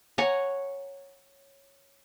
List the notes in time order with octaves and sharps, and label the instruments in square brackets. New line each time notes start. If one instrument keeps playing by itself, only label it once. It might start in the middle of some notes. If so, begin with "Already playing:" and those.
[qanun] C#5 F#5 G#5 A#5